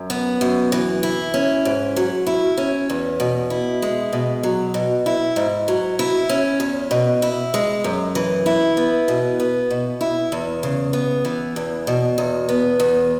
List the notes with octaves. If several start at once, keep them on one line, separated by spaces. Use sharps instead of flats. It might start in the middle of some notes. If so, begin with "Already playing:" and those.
Already playing: F#2
B3
F#2
E3
E4
C#4
G#2
F#3
E4
C#4
E2
B2
E4
G#3
B2
F#3
B2
E4
G#2
F#3
E4
C#4
E2
B2
E4
G#3
F#2
E3
E4
B3
B2
B3
B2
E4
E2
C#3
B3
E3
E2
B2
E2
B3
E2